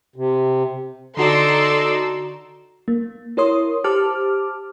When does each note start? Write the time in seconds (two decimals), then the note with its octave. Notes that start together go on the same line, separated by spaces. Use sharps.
0.16 C3
1.17 D3 D#4 F#4 A4 D5 A#5 C6 E6
2.88 A#3
3.37 E4 A#4 C#5 C6 D#6
3.84 G4 C5 A5 D6 F6